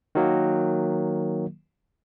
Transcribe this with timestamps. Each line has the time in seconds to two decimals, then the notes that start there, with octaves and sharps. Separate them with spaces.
0.15 D#3 F#3 A#3